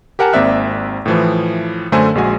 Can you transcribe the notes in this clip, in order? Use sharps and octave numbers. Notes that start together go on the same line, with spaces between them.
G4 A#4 F#5 G#5 A5
G#1 A#3 C4 D5 E5 F#6
A2 E3 F3
F#2 D3 A3 A4 C5 G#5
A#1 G#3 F#4 G#5